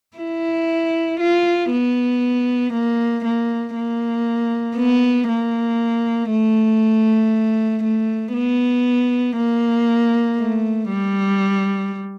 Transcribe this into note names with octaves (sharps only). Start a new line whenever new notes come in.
E4
F4
B3
A#3
A#3
A#3
B3
A#3
A3
A3
B3
A#3
A3
G3